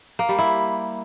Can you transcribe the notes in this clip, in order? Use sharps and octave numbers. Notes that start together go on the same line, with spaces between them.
A#3
G3
E4